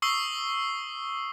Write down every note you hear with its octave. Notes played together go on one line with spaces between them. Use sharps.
C#6 D#6 E6 C7 G7